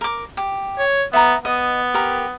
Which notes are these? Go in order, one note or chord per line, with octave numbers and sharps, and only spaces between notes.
A#4 D6
G4
C#5
B3 E5 A#5
B3 D#5
G4 A#4